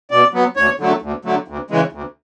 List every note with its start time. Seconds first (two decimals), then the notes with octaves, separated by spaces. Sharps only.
0.11 B2 D5
0.33 F#3 B3
0.56 D2 C#5
0.79 D3 F#3 A3
1.02 D2
1.25 D3 F#3 A3
1.48 D2
1.70 C#3 E3 G#3
1.92 D2